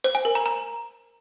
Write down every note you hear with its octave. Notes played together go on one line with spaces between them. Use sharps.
C5
G#5
A#4
A#5
A#5